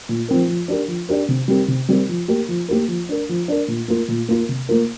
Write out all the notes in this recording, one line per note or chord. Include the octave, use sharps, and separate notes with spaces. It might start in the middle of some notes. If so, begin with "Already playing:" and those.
A#2
F3 C4 A#4
F3
D4 G4 A#4
F3
D4 G4 A#4
C3
G3 C4 G4 A#4
C3
G3 C4 G4 A#4
F3
A#3 G4 A#4
F3
A#3 G4 A#4
F3
D4 A#4
F3
D4 A#4
A#2
A#3 F4 A#4
A#2
A#3 F4 A#4
C3
A#3 F4 A#4